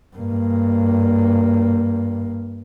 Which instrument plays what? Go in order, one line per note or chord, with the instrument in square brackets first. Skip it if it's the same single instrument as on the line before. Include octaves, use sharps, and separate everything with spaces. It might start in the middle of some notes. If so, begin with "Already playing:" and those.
[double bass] G2 A#3